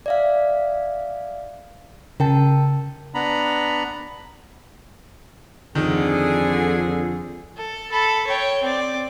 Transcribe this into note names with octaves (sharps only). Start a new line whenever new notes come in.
D5 E5 F5
C#3 A#4 G5 A5
B3 D4 A#5 B5
F2 D3 D#3 G#4
A4
A4 B5
C#5 G5
C4 D5